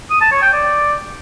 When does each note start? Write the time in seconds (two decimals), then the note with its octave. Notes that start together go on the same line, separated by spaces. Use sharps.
0.11 D#6
0.21 A5
0.32 C#5
0.42 G5
0.53 D5